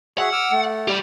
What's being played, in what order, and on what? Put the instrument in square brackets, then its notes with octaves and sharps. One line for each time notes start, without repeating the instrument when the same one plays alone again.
[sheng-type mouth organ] F#4 G#4 E5 [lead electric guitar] F#5
[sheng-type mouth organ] D6 E6 F6
A3
[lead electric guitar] G4 D5